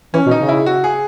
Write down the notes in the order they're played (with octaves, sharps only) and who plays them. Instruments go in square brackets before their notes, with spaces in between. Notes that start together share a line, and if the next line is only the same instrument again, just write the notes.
[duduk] E3 [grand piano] C#4
[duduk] B2
[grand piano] D#4
[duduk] C#3
[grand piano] E4
F#4
G#4